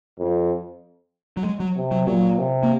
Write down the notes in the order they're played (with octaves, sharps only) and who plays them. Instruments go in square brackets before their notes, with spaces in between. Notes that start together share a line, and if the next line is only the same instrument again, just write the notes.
[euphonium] F2
[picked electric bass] F#3
G#3
F#3
[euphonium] C3
[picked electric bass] F#3
[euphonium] A#2 [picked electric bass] F#3
[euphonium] C3
[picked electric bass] A#3